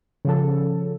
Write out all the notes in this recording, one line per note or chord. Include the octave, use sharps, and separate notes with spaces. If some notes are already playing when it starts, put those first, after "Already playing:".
C#3 F3 A4